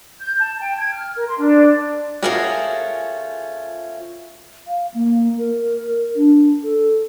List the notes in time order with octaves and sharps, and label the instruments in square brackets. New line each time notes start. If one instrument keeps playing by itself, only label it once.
[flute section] G6
A5
G5
G#6
F6
A#4
C6
D4
[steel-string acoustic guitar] F3 A3 C#4 [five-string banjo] F#4 G#4 A#4
[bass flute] F5
A#3
A#4
D4
A4